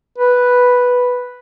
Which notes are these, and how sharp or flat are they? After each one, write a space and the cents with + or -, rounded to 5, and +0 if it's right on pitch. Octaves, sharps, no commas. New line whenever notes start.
B4 +0